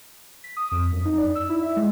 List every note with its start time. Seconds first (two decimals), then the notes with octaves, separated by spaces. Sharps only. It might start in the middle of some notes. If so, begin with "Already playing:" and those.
0.44 B6
0.57 D#6
0.72 F2
0.92 F#2
1.05 D#4
1.17 D5
1.35 E6
1.49 E4
1.63 E5
1.76 G#3